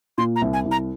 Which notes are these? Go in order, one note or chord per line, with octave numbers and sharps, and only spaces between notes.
A#2 C6
A#5
C2
G#5
C2
A#5